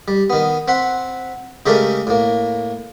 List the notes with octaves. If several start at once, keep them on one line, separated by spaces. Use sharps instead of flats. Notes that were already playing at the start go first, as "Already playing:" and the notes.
G3
D#3 B3
C4 F#5 B5 C6
C#3 G#3 A3 G4 A4 A#4
A2 A#3